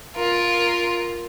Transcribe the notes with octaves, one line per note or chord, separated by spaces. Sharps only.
F4 A#4